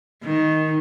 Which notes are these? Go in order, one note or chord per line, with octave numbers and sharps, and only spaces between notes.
D#3